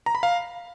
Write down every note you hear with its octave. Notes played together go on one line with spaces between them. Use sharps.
A#5
B5
F5